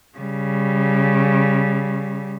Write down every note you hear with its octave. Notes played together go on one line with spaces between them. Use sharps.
C#3 G3